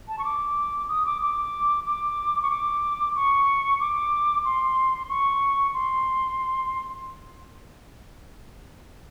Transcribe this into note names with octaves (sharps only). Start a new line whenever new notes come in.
A5
C#6
D6
D#6
D6
D6
D6
C#6
D6
C#6
D6
C6
C#6
C6